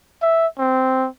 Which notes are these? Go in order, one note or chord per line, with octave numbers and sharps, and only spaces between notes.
E5
C4